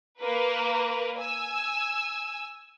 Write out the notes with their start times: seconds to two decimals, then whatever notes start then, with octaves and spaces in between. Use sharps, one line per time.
0.20 A#3 A#4 B4
1.18 G#5 E6